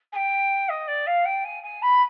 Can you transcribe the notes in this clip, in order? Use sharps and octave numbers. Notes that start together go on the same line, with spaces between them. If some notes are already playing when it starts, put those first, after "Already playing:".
G#5
G5
D#5
D5
F5
G5
G#5
G#5
B5